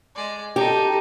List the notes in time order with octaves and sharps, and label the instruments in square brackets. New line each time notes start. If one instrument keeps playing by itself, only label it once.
[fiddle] G#3 D5
[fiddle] D#4 A4 [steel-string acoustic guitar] G4